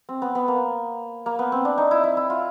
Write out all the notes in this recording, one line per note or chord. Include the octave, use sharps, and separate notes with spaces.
C4
B3
B3
A#3
A#3
B3
C4
D4
D#4
E4
E4
E4
F4